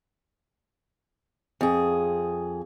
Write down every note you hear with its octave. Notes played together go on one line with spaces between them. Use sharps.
F2 G#4